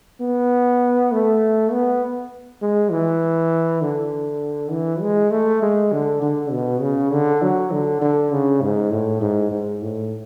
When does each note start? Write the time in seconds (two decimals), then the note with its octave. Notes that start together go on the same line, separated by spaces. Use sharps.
0.21 B3
1.12 A3
1.71 B3
2.62 G#3
2.91 E3
3.81 D3
4.71 E3
5.01 G#3
5.31 A3
5.62 G#3
5.92 D3
6.22 D3
6.51 B2
6.81 C#3
7.12 D3
7.42 F#3
7.72 D3
8.01 D3
8.32 C#3
8.62 G#2
8.91 A2
9.21 G#2
9.52 G#2
9.82 A2